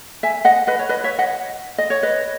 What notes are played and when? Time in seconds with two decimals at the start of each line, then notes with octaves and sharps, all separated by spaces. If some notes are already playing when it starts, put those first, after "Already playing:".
0.23 E5 G#5
0.45 D#5 F#5
0.67 B4 D#5
0.79 C#5
0.89 B4 D#5
1.04 C#5 E5
1.19 D#5 F#5
1.78 D#5
1.90 C#5
2.03 B4 D#5